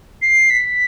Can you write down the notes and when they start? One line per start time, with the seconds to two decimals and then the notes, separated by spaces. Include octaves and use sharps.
0.22 C7
0.50 B6